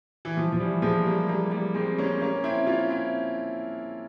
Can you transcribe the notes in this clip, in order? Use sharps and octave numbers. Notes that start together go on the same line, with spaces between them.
E3
F3
F3
E3 G3
F3 G#3
G3 A#3
G3 A#3
G3 A#3
G#3 C4
A#3 C#4
A#3 C#4
C4 E4
C#4 F4
C4 E4